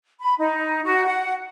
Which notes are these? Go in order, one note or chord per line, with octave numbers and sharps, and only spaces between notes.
B5
D#4
F#4
F#5